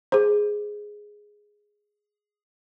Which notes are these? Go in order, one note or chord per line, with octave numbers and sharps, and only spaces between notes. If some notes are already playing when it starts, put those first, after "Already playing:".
G#4 C5